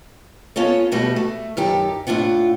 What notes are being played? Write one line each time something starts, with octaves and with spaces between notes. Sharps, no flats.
B3 C#4 F4 A4 C#5
B2 G3 A3 F#4
A3
F#2 D#3 G4 A4
A2 C#4 D4 F4 F#5